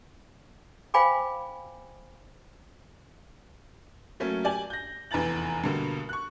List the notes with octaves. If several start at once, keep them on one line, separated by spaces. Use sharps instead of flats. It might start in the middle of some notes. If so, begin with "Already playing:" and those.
C5 F5 G5 G#5 B5 D6
F#3 A3 A#3 C#4
G4 D5 G#5 F#7
G6 A#6
F1 E2 B4 A#5 A6 F#7
G2 B2 D3 G3 A#3
C#6 F#6